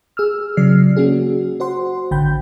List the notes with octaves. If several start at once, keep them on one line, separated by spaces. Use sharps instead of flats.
G#4 E6 F6
C#3 F#3 D5 F6 C7
A#3 C#4 F#4 G#4
F#4 C5 F#5 C6
A1 D3 G5 B5 G6